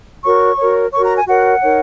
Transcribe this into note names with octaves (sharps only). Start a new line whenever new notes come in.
F#4 A#4 C#5 C#6
F#4 A#4 C#5
F#4 A#4 C#5 C#6
A#5
G#5
F#4 A#4 C#5 F#5
D#4 A#4 C#5